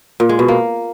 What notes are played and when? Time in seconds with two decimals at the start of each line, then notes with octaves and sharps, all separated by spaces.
0.20 A#2
0.29 G#3
0.39 B2
0.48 A#3